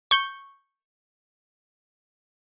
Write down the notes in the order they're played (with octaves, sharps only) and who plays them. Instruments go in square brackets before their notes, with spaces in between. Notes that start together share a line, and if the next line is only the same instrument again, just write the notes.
[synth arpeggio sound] C#6 G6